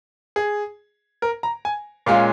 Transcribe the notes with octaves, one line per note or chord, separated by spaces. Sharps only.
G#4
A#4
A#5
G#5
A#2 G#3 C#4 F4 F5